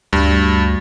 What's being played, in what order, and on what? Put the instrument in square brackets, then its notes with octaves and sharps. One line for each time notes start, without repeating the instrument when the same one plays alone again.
[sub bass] D2 [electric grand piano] G2